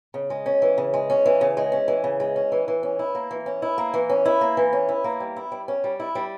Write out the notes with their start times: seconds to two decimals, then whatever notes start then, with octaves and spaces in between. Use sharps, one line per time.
0.14 C#3
0.30 G#3
0.46 C#4
0.62 E3
0.78 C#3
0.94 G#3
1.10 C#4
1.26 E3
1.41 C#3
1.57 G#3
1.72 C#4
1.88 E3
2.04 C#3
2.20 G#3
2.36 C#4
2.52 E3
2.68 E3
2.83 C#4
2.99 E4
3.15 A#3
3.31 E3
3.46 C#4
3.62 E4
3.78 A#3
3.94 E3
4.09 C#4
4.25 E4
4.41 A#3
4.57 E3
4.73 C#4
4.89 E4
5.04 A#3
5.20 G3
5.36 E4
5.52 G3
5.68 C#4
5.84 G3
6.00 E4
6.15 G3